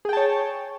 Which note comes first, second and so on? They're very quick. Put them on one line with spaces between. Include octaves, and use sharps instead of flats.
G#4 G5 A5 C#5